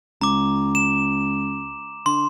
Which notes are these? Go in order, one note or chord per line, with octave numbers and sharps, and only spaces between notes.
C#2 A#5 D6
E7
D3 C6